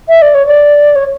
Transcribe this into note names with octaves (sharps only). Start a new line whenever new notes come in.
E5
D5
C#5
D5
C#5